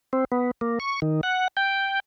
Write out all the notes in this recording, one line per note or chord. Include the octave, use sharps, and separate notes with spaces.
C4
B3
A#3
C#6
D#3
F#5
G5